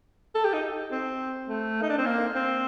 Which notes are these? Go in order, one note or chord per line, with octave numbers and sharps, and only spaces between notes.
A4
G4
D#4
C4
A3
D#4
D4
C4
A#3
C4